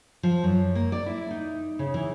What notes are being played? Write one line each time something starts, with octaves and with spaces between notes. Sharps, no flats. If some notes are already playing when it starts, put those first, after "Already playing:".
F3
F#2
A#3
D5
E4
D#4
C#3
E3